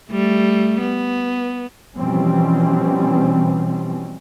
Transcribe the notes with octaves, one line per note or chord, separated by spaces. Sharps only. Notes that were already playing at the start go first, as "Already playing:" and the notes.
G3 A3
B3
B2 E3 F3 G3 C4 C#4